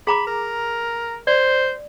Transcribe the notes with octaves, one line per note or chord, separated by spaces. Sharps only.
G#4 A#5 B5 D6
A#4
C5 D5